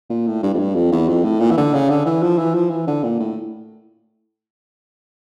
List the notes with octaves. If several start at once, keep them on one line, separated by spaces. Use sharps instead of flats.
A#2
A2
G2
F2
G2
F2
E2
F2
A2
A#2
E3
D3
C#3
D3
E3
F3
E3
F3
E3
D3
A#2
A2